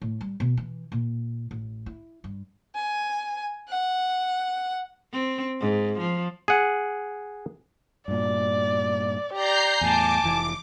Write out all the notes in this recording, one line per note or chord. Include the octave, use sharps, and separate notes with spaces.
A2
G3
B2
E3
A#2
A1
E4
G2
G#5
F#5
C4
G#2
F3
G#4 F#5
G2 A#2 D5
G4 D5 A#5 G6 C7
E2 A2 G#5 A5 D6
F1 E3